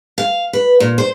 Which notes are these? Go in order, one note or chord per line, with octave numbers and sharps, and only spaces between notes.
F5
B4
A#2
C5